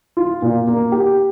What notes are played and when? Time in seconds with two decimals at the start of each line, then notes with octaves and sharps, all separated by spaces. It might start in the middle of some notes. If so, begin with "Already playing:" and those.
0.17 F4
0.42 A#2
0.67 A#3
0.92 G4